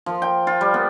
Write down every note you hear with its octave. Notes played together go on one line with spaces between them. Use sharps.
F3
G5
F4
G3
B3